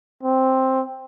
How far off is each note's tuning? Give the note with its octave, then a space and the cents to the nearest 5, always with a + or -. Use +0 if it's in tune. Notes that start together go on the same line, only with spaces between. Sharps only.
C4 +5